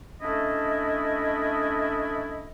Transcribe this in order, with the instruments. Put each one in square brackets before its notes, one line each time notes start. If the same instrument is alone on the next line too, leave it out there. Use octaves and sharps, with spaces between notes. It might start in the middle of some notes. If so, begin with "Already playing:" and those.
[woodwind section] A3 C#4 D4 E4 D#5